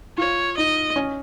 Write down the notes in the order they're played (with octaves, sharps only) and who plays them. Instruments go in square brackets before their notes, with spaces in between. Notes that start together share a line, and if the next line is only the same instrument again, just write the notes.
[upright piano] F4 [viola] C#5
[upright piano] D#4 [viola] D#5
[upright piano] C#4